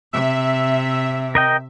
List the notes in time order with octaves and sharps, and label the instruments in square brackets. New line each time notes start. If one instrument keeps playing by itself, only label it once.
[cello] C3 [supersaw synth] E5
[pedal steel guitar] A#4 D#5 G5